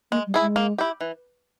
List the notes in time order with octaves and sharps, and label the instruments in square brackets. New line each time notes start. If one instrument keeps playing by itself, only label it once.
[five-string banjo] G#3 [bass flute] A#3
[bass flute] G3
[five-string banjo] E4 G#4
[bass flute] G#3
[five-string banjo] A#3
E4 G4
E3